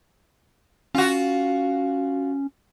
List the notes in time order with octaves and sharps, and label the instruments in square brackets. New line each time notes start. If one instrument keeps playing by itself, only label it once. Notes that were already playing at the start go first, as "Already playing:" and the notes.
[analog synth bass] C#4 [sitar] F4 F#4